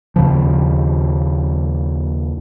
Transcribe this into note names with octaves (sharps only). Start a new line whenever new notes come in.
D#2 C#3 F3